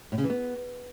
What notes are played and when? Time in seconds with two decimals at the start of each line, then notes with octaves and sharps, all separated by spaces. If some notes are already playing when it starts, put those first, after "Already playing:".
0.12 A2
0.18 C#3
0.24 E3
0.30 B3